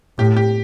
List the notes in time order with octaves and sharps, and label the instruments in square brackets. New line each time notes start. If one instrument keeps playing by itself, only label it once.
[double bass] A2 [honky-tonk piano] G4
[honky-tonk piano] G4